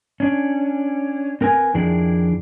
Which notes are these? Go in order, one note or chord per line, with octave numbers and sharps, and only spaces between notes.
C#4 D4
C4 A#4 B4 G#5
F2 D#3 D4 E4 G#4